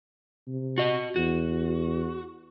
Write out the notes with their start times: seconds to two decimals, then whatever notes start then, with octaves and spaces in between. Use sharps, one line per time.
0.47 C3
0.78 F#4 D#5
1.16 E2 F#4